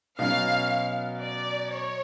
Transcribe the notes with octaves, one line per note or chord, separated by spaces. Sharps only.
B2 F#3 C#4 F5
D5
C#5